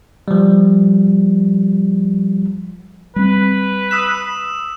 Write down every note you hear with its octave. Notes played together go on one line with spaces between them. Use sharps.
F3 G3
G3 C4 B4
D#6 E6 E7